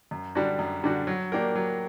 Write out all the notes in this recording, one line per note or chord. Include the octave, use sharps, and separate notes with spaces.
F#2
D3 G3 D4 F#4
F#2
D3 G3 D4 F#4
F#3
A#3 D4 G4 A#4
F#3